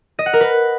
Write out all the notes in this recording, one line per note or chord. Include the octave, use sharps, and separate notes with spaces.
D#5
F#5
A#4
B4